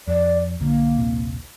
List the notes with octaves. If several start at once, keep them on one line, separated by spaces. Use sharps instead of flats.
F2 D5
B1 D3 A#3
D#1 A#1 C3